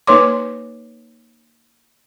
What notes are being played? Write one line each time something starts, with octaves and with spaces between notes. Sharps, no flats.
A#3 D#4 B4 C#5 C6 D6